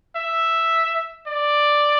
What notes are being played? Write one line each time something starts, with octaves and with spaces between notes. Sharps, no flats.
E5
D5